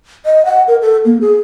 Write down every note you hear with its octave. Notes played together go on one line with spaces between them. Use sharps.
D#5
F#5
A#4
A4
A#3
G#4